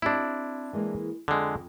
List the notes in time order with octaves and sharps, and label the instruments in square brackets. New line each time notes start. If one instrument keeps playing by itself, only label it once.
[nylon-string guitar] C4 G4 D#5 [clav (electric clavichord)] D4 E4
[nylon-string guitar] E3 G#3 A#3
[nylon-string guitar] F2 [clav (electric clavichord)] D3 G#3